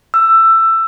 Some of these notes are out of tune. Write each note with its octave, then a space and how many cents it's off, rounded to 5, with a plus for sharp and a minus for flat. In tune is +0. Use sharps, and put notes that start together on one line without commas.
E6 +15